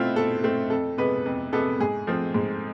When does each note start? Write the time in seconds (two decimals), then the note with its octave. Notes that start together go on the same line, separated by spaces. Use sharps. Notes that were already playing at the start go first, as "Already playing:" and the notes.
Already playing: B2 A3 C4 E4 F4
0.16 B2 A4
0.44 A3 C4
0.70 F2 A4
0.98 C3 G#3 B3 B4
1.26 F2
1.53 C3 G#3 B3 A4
1.80 G#2 G#4
2.07 F3 A3 C4
2.34 G#2